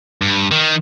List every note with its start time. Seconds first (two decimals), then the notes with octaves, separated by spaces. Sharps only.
0.22 G2
0.51 D#3